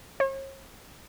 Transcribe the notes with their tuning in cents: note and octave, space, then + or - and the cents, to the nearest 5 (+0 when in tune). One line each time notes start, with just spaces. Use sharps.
C#5 -45